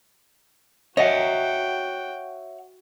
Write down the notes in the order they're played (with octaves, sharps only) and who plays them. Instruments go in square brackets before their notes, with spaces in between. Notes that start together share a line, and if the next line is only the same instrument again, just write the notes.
[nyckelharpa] F#4 G5 [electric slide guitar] C#5 E5 F#5 [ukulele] D#5